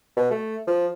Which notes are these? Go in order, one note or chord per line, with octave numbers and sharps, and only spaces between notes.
B2
A3
F3